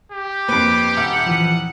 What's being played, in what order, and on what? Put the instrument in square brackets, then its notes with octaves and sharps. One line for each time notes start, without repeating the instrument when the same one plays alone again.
[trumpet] G4
[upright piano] F2 B4 [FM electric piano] A#3 [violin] D6
[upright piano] D#1 [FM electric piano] E5 [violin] F#5
[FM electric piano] E3 F3